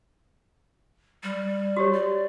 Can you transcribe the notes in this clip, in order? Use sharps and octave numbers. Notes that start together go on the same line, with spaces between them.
G3
F#4 G4 C#5
D5